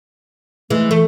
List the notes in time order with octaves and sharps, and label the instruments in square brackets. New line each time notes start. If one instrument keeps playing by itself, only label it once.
[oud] E3 G#3 [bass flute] A3
[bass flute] E3 [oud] A3